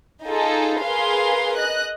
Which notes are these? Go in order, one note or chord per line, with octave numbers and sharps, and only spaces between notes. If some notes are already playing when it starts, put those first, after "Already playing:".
D#4 F4 G#4 A4
G#4 A#4 B4 F5 C6
D#5 F#6